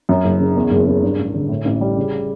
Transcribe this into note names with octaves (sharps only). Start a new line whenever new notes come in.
F#2
F#1
C#3
E2
F#1
C#3
G2
A1
D3
A2
A1
G3
C#3